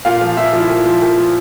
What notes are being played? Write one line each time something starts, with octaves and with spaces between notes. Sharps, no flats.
A#2 F5
F3
A#2 E5
F3
E4
A#2
F3
A#2
F3